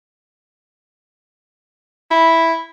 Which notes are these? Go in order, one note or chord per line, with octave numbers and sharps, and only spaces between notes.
E4